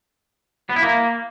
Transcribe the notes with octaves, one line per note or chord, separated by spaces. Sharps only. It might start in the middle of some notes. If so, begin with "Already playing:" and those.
B3
E4
A#3